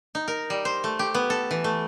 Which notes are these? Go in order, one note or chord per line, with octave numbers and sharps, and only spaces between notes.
D#4
A#4
G3
C5
A3
G4
B3
A4
E3
A3